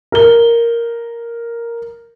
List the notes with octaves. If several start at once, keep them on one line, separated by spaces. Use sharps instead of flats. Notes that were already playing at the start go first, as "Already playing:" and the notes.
A#4 G7